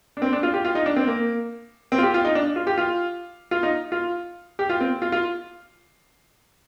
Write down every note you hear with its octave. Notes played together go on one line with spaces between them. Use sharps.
D4
C4
D4
F4
G4
F4
D#4
D4
C4
A#3
C4
F4
G4
F4
D#4
D4
F4
G4
F4
F4
D#4
F4
G4
F4
C4
F4
F4